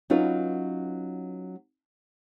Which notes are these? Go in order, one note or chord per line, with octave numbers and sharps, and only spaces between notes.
F#3 C#4 D#4 F4 B4